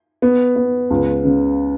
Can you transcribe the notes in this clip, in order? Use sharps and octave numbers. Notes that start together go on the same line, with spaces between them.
B3
B3
C#2
C#3